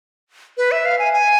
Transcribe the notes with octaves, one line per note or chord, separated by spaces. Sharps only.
B4
E5
F5
G#5
G#5